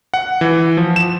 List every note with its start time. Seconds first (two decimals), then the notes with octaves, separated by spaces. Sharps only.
0.14 F#5
0.41 E3
0.77 F3
0.96 E7